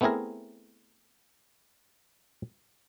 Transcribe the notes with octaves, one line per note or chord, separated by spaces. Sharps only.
A3 B3 C4 E4 G#4 A#4